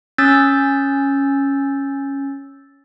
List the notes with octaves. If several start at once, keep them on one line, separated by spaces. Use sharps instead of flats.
C#4 E6 G6 A6